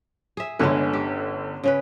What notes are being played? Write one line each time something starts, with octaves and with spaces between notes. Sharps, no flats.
G#4 E5
G1 D3 G#3 C#4 A4 B4
G4
C#3 C#4 B4